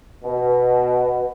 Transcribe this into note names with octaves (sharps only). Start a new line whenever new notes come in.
B2